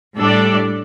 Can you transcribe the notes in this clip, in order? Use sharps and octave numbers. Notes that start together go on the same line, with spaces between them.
A2 G3 D4 A4 D5